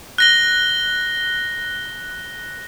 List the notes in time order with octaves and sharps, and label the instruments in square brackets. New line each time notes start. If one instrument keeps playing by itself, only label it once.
[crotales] F#6 A#6 G7